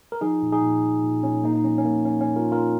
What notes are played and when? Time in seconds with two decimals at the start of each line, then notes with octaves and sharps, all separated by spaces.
0.12 A#4
0.21 F3 D#4 G#4
0.42 A#2
0.52 D#4 G#4
0.62 A#2
0.83 A#2
1.03 A#2
1.23 A#2 C#4
1.44 A#2 A#3 D#4
1.55 D#4
1.64 F3 C#4
1.78 C#4
1.85 A#2 A#3
2.05 F3 C#4
2.21 C#4
2.26 A#2
2.36 F4 A#4
2.46 A#2
2.52 F4 A#4